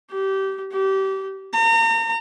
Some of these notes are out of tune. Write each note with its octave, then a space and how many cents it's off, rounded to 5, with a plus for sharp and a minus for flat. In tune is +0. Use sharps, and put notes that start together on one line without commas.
G4 -25
G4 -25
A#5 -40